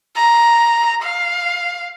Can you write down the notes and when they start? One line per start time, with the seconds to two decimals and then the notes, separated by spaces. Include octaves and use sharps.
0.16 A#5
1.03 F5